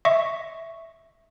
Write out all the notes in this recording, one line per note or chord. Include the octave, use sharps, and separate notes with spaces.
D#5 E5 C#6